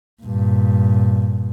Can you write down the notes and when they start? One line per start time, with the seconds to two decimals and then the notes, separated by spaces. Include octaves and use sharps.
0.23 G2 A#2